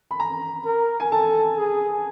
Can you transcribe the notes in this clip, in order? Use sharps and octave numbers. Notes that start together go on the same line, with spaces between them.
B5
A#5
A#4
G#5
A4 A5
G#4